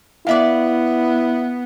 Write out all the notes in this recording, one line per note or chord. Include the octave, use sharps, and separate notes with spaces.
B3 E4 D5 E5 F5